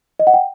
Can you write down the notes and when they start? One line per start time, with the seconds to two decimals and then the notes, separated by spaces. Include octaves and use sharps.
0.20 D#5
0.27 F#5
0.34 G5